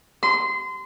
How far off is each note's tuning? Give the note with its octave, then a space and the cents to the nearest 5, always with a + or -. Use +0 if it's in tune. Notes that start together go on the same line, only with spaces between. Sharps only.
C6 -25